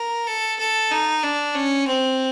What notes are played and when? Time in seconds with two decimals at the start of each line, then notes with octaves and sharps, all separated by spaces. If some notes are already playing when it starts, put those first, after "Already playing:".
Already playing: A#4
0.27 A4
0.59 A4
0.91 D#4
1.23 D4
1.54 C#4
1.87 C4